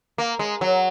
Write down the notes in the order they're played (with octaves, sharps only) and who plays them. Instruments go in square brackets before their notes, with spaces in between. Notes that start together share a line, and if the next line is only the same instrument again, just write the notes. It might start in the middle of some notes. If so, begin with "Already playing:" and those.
[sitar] A#3
G#3
F#3